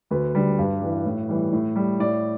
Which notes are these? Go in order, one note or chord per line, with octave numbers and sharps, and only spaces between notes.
D2 B4
D3 G3
G2
E3 G3
A2
E3 G3
A2
G3
A2 D5